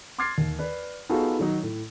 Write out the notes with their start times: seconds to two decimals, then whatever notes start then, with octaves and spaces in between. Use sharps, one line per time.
0.18 C6 D6 F6 G#6 A6 C7
0.38 D#2
0.59 B4 D5
1.09 B3 D#4 F4 F#4 G#4 A4
1.39 D#3 F#3 D#4
1.63 A2